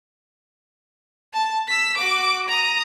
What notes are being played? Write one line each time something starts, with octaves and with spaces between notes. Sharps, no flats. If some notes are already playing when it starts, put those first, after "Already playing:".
A5
E6 B6
F#4 D6
A#5 D#6